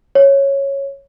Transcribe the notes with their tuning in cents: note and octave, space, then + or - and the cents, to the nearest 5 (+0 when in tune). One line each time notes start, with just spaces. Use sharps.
C#5 -5